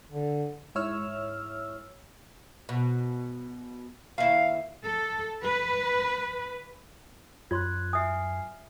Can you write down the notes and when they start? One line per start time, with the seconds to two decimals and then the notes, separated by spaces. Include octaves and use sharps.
0.11 D3
0.75 G#2 E4 C#5 E6 F6
2.69 B2
4.18 D#2 E4 F5
4.84 A4
5.43 B4
7.51 F#2 F4 C#5 C6 F#6 G#6
7.93 E5 G#5 D#6 F6 C7